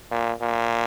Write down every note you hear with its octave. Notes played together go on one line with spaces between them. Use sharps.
A#2
A#2